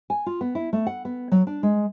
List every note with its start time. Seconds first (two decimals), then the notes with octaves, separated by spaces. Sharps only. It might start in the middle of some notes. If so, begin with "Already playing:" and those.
0.10 G#5
0.26 F4
0.41 B3
0.55 E4
0.73 A3
0.87 F#5
1.05 B3
1.32 F#3
1.47 D4
1.63 G#3